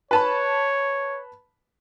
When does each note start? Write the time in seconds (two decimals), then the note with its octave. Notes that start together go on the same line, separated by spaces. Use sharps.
0.11 B4 C#5 A5 B5